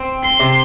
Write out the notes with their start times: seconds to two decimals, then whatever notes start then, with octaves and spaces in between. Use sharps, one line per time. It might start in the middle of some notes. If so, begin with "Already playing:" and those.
Already playing: C4
0.23 C6
0.40 C3